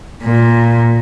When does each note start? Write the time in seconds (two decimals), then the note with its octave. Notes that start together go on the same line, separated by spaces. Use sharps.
0.23 A#2